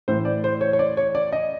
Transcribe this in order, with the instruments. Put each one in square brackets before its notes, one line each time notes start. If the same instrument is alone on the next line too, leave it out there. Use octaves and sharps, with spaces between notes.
[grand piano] A2 E3 C5
D5
C5
C#5
C#5
D5
C#5
D5
D#5